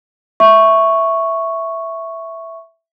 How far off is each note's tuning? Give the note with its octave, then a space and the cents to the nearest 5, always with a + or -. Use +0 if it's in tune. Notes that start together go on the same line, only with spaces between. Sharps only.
E5 +0 C#6 +0